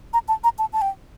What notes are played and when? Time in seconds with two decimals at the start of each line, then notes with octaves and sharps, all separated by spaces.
0.13 A#5
0.28 A5
0.44 A#5
0.59 A5
0.73 A5
0.82 G5